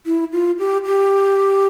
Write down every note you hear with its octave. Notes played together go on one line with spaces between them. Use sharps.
E4
F4
G4
G4